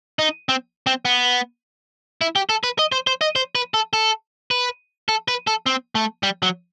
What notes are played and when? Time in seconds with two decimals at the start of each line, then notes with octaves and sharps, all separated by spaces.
0.19 D#4
0.49 C4
0.87 C4
1.05 B3
2.21 E4
2.36 G4
2.49 A4
2.64 B4
2.79 D#5
2.92 C5
3.07 C5
3.21 D#5
3.36 C5
3.55 B4
3.74 A4
3.93 A4
4.51 B4
5.09 A4
5.28 B4
5.47 A4
5.66 C4
5.95 A3
6.23 G3
6.43 F#3